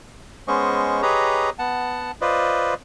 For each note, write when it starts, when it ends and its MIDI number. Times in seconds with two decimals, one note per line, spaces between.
0.48 1.02 56
0.48 1.02 59
0.48 1.02 61
0.48 1.02 72
0.48 1.02 75
0.48 1.02 85
1.02 1.50 67
1.02 1.50 68
1.02 1.50 71
1.02 1.50 73
1.02 1.50 75
1.02 1.50 82
1.59 2.11 59
1.59 2.11 78
1.59 2.11 81
2.21 2.74 65
2.21 2.74 71
2.21 2.74 72
2.21 2.74 74
2.21 2.74 75